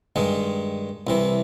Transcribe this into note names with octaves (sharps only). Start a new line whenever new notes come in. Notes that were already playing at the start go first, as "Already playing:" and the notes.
G2 D#3 G#3
C2 C3 E3